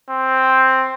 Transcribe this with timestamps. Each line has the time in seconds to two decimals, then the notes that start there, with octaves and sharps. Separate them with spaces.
0.10 C4